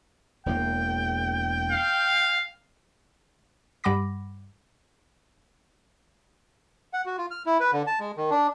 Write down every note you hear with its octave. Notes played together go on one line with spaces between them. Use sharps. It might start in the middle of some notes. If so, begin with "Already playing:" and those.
E1 E2 A#3 G5
F5
G2 G3 F#5 B5 D6 A#6
F#5
F#4
F4
F6
E4
B4
D3
A5
G#3
D#3
D4